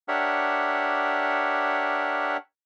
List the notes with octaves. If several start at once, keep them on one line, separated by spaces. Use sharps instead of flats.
D4 G4 A#4 C#5 E5 F#5